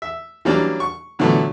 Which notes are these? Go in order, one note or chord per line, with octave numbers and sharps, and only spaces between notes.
E5
E3 F#3 G3 A#3 C#4 D4
C#6
A#2 D3 E3 F#3 A3 B3